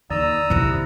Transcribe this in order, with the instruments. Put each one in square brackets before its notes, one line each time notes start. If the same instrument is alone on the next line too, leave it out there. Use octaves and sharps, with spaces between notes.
[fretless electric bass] D#2 D#3 [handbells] D5 [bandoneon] A#5 D#6 E6
[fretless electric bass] A#1 C3 [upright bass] D#3 C4 [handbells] E4